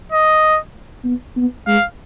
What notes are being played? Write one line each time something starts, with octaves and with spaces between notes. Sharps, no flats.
D#5
B3
B3
G#3 F5